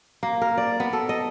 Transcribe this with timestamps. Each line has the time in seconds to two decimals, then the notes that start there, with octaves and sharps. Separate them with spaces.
0.23 A#3
0.42 A#4
0.58 D5
0.80 B3
0.93 A4
1.09 D#5